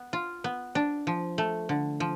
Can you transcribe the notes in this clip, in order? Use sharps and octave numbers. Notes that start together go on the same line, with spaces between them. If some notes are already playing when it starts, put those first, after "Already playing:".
Already playing: B3
F4
B3
D4
F3
A3
D3
F3